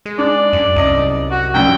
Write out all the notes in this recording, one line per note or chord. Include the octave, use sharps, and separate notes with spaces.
G#3
D4 D5
F#2
C2 F#2 D#5
F#4
A#1 F#2 G5